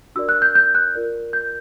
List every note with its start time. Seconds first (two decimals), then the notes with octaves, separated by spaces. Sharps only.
0.15 D4 F#4 A#4 D5 E6
0.29 F#6
0.42 G6
0.55 G6
0.75 F#6
0.95 F4 A#4 D5
1.33 G6